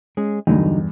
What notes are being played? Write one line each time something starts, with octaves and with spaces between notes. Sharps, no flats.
G#3 C#4 G#4
E2 G2 D3 F#3 D#4